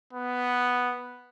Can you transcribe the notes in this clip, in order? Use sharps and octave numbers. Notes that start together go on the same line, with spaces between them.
B3